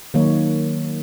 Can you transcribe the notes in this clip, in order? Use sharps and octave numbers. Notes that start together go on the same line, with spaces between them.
D#3 F#3 A#3 D#4 C#5